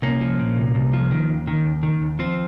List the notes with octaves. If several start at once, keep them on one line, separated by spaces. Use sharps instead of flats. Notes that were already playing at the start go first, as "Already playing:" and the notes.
C2 A#3 C#4
F3
A#2
C2
C2
F3
D#3
D#2
D#3
D#2
D#3
D#2
F3 C4